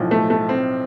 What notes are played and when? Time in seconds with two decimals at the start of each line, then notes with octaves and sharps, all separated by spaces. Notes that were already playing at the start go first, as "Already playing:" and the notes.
Already playing: B1 A2 F3
0.11 A3
0.30 A3
0.49 C4